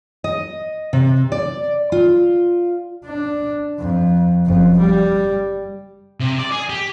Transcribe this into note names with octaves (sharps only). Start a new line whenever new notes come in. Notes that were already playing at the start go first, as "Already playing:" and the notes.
D#5
C3
D5
F4
D4
F2
F#1 F2
G3
C3
D5
G#4
G4